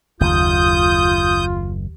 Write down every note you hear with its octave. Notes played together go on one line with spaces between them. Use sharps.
F#1 D#2 F4 D#6 G6